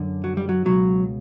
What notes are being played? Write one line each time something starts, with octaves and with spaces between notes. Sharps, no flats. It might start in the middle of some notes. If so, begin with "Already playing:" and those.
Already playing: F#2 D3
F#3
G3
F#3
C#2 B2 F#3